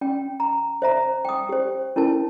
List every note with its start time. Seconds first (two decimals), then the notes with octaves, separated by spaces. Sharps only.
0.01 C#4 G5
0.40 A#5
0.82 C5 E5 A#5
1.25 G5 D#6
1.49 G4 C5
1.96 C#4 E4 A#4 A5